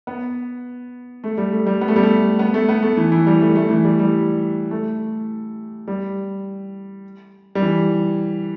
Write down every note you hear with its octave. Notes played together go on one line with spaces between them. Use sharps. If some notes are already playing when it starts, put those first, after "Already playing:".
B3
A3
G3
A3
G3
B3
A3
G3
A3
B3
A3
B3
A3
E3
E3
G3
A3
A3
E3
G3
G3
A3
G3
G3
E3